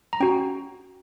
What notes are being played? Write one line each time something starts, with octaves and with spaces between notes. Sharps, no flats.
A#5
C#4 F#4 G5